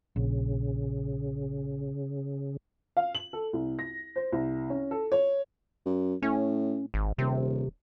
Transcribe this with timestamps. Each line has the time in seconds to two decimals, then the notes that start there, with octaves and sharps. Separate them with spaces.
0.16 A#1 C#3
2.97 F5
3.15 F#7
3.33 A4
3.53 C2
3.79 A#6
4.16 C5
4.33 C2
4.70 C#4
4.91 A4
5.12 C#5
5.86 F#2
6.22 A2 C#4
6.94 G#1
7.18 D#1 C3